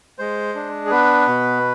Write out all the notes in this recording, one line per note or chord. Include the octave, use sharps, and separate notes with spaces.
G#3 C5
D4
G#4
B3 B4
B2